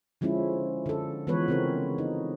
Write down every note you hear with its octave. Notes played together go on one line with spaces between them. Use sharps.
D3 F3 G#3 C#4 E4
D3 A4
E3 F3 G#3 B3 B4 C#5
C#3 C4 A#4
D#4